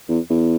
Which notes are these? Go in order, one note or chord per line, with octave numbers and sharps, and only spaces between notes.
E2
E2